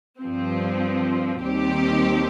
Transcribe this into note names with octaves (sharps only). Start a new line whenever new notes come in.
G2 F3 C4
D#2 D#3 G3 C4 G4